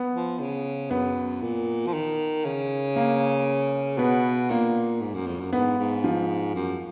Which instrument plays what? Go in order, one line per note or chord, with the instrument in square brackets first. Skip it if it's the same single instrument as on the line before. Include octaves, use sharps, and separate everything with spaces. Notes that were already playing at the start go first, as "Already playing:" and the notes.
Already playing: [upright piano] B3
[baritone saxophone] F3
C#3
[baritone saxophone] F#2 [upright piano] B3
[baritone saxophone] A#2
F3
D#3
C#3
[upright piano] A#3
[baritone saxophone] B2 [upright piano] B3
[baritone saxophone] A#2 [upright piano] A#3
[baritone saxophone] G#2
F#2
F2
F#2
[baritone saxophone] G#2 [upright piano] B3
[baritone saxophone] G#2
[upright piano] F3
[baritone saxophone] F#2